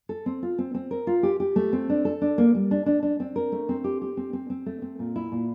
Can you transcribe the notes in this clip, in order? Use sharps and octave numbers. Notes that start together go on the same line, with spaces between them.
A4
C4
F4
C4
C4
A#4
F4
G4
G4
A3
C4
D4
A4
D4
A#3
G3
D4
D4
D4
C4
A#4
A3
C4
G4
G4
C4
C4
C4
A3
C4
A#2
E4
A#2